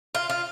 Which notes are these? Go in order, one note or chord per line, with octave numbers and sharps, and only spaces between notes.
F4
F4